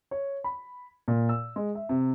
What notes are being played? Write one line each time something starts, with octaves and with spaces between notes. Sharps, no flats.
C#5
B5
A#2
E6
G#3
E5
C3